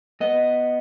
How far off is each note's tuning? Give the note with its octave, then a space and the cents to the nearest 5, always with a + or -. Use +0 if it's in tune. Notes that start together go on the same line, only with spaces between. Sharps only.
B3 +0 D#5 +0